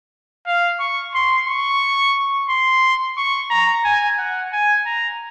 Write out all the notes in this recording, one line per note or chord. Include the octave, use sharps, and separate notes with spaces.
F5
C#6
C6
C#6
C6
C#6
A#5
G#5
F#5
G#5
A#5